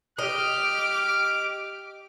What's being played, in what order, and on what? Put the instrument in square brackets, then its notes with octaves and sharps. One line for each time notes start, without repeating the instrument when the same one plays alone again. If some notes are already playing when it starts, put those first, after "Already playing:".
[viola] G4 D6 [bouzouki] D#5 [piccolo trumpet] F6